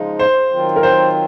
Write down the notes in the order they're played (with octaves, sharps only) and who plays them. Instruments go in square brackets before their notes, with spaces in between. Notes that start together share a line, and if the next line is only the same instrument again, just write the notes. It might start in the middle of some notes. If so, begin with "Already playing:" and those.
Already playing: [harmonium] C#3 F3 G#3 D#4
[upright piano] C5
[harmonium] D#3 F#3 C4 F4
[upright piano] A#4
C5